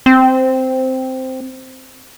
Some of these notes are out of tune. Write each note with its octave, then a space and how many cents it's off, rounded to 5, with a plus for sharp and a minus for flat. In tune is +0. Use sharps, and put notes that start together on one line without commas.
C4 -5